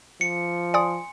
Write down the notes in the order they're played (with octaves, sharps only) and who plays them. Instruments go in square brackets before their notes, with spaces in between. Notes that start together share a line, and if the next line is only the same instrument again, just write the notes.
[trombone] F3 [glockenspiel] C#7
[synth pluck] D5 D#6 [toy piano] G#5 C6